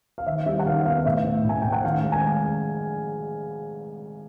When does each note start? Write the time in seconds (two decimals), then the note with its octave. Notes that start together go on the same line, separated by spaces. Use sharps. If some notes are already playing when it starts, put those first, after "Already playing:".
0.18 F5
0.26 D#3 E5
0.46 G3 E5
0.59 F#5
0.66 D#3 F5
0.85 B3 F5
1.06 A2 E5
1.25 A2
1.44 A2
1.49 G#5
1.61 A2 G5
1.72 F#5
1.84 D#3 F5
2.03 G#3
2.12 G#5